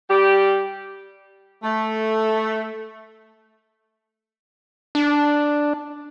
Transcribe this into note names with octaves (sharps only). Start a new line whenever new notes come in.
G3 G4
A3
D4